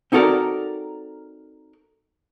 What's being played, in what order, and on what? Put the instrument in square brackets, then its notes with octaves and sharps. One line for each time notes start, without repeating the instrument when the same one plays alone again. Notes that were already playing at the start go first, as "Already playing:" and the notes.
[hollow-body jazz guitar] C4 D#4 F#4 A4 A#4 D5